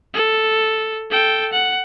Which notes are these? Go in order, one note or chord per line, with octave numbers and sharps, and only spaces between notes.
A4
A4 G5
F#5